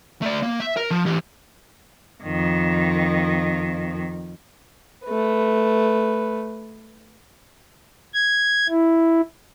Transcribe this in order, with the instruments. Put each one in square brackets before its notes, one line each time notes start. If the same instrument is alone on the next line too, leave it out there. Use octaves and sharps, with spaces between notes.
[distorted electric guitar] A3 D5
A#3
E5
A#4
F3
E3 G4
[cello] F2 D#3
[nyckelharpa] A3 B4
[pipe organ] G#6
E4